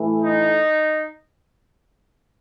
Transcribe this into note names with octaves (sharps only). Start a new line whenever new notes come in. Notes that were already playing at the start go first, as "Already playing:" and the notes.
Already playing: A2 E3 A3
D#4